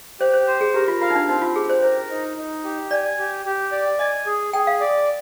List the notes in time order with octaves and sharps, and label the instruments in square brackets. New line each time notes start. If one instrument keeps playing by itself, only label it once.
[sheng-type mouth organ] G4 [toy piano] C5
[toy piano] C5
[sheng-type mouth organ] C5
[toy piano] G#4
[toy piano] G4 [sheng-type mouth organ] A#4
[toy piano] F4
[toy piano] F4 [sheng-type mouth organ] F5
[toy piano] D#4
D4
[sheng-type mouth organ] C4 [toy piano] D#4
[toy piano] F4
[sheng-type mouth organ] G4 [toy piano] G#4
[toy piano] C5
[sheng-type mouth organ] A#4 [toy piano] C5
[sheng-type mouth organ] D#4
D#4
G4
[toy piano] D5 [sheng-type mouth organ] G#5
[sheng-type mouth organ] G4
G4
D5
[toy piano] D#5 [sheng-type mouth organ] G#5
[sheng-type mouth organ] G#4
[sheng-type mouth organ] G#4 [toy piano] G5
[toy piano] F5
[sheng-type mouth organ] D5